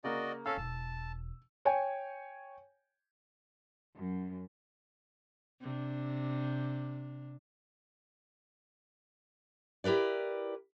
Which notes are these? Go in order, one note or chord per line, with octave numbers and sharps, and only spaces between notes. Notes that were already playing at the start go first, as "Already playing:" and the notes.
C#3 A#3 F#4 D5 D#5
C#4 A4 F5 E6
E1 A5
C#5 G5 G#5
F#2
C3 D4
E4 G4 A#4 B4 D5